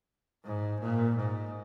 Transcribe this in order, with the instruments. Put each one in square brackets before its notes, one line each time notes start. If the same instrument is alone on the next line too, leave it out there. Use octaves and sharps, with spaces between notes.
[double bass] G#2
A#2
G#2